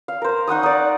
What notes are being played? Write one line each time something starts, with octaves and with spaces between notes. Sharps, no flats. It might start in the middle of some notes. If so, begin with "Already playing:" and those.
F5
A#4 C5
D#4 F#5 C#6 D#6
D#4 D5